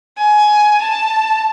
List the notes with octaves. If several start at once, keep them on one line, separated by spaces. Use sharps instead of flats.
G#5
A5